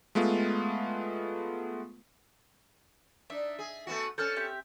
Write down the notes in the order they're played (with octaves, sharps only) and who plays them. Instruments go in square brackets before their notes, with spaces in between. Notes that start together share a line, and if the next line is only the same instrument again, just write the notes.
[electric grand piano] G#3 A3 B3 F4
[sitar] D4 D#4 [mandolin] E5
[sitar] G#4
A3 B3 F#4
[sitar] C#4 A4 [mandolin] C5 F6 F#6
[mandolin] C4 G4 E5